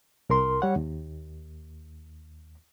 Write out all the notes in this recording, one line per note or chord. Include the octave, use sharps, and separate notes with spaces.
C2 A#4 C6
G3 C#5 F#5
D#2